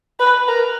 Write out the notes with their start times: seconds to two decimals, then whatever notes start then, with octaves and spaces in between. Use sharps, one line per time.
0.20 B4
0.48 A#4